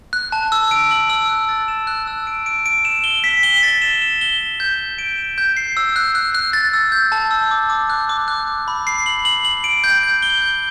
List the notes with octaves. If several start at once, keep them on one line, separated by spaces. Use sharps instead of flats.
F#6
A5
E6
D7
F#7
E6
F#6
A6
E7
F#6
E6
D7
D7
D7
E7
G7
B6
G7
A6
E7
E7
G7
G7
G6
G6
D7
E7
G6
C7
E6
F#6
F#6
F#6
A6
E6
G6
A5
E6
D6
D6
F#6
D6
F#6
F#6
B5
C7
F#7
F#7
F#7
D7
G6
G6
G7
G6